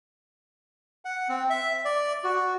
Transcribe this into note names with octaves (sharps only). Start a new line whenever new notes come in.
F#5
C4
E5
D5
F#4